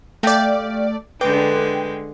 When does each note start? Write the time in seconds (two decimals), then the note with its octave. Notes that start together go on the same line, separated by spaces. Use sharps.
0.23 A3 G4 D5 F5 G5
1.21 D3 G#3 B4 G5 D6